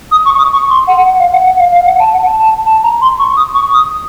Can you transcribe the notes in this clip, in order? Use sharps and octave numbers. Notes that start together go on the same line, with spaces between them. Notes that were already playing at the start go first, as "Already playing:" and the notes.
D#6
C#6
D#6
C#6
C6
F#5
F#5
F5
F#5
F#5
F5
F5
F#5
A5
F#5
A5
A5
A5
A#5
C6
C#6
D#6
C#6
D#6